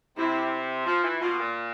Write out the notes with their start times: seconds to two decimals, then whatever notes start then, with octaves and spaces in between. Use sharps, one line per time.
0.17 C3 E4
0.86 F3 F4
1.04 E3
1.21 B2 F4
1.39 A#2